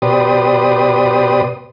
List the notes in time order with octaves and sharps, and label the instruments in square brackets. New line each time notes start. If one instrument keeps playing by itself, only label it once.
[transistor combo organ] B2 G4 B4 C5 D5 D#6